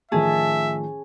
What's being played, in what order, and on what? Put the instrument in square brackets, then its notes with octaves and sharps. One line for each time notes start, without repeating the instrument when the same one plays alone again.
[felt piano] A2 D#3 F3 [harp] C#4 G#4 A5 [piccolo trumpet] E5